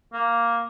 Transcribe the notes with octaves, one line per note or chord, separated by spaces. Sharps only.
A#3